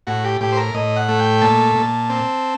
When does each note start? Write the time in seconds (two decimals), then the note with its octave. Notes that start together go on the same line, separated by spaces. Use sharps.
0.07 A2 F#4
0.24 G4
0.41 A2 G4
0.52 C5
0.57 A#4
0.74 A2 D#5
0.96 F#5
1.09 A3
1.19 G5
1.41 A#2 A5
1.75 A#2
2.10 C4